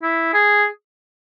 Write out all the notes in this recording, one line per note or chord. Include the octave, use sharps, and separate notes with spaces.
E4
G#4